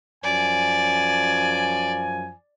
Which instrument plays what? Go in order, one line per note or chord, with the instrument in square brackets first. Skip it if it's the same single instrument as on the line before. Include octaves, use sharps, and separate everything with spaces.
[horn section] F#2 F3 G#5 [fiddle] D5